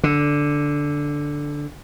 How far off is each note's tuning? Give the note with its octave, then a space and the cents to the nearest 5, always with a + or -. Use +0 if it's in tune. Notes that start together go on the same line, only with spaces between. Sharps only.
D3 -5